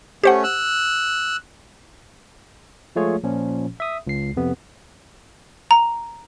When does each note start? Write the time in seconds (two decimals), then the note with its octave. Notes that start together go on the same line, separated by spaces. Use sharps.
0.24 A3 C#4 G4 C5 F#5
0.43 E6 F#6
2.96 F3 G#3 A3 F4 G#4 C#5
3.24 A#2 F3 C#4
3.80 E5 D#6
4.07 C#2 C7
4.37 F2 C3 B3
5.71 A#5